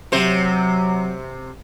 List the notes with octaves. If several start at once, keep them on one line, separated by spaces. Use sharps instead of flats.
C3 F#3 C5